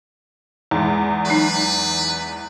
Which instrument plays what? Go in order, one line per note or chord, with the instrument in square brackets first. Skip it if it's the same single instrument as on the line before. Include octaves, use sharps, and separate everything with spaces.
[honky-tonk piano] E2 G#2
[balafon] F#3 D#4 [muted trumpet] B4